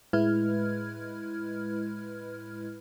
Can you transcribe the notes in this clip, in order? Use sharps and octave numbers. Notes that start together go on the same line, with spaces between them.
A2 G#3 E4 B4 F6 G#6